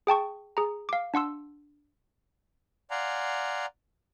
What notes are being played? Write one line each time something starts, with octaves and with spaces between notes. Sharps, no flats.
G#4 G5 A5 C#6
G#4 A#5
F5 D6
D4 F#5 C6 E6
D5 F5 F#5 G#5 A#5 C6